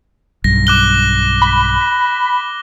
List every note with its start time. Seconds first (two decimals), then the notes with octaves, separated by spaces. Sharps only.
0.44 B1 G2 A#6
0.67 D6 F#6 G7
1.42 B5